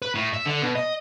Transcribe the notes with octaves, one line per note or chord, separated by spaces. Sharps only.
B4
A2
E5
D3
B2
D#5